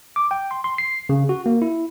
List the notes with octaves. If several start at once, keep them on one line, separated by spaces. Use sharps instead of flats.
D6
G5
C6
C6
C7
C#3
F#4
A#3
E4